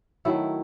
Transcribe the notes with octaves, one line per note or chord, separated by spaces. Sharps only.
D#3 F#3 A3 E4